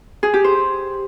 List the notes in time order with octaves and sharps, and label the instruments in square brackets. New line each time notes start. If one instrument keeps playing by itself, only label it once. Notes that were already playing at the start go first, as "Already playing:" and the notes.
[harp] G#4
G4
C5